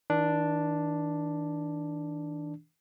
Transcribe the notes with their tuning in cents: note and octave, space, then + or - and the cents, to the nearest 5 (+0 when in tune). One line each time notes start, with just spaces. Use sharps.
D#3 +45 D4 +0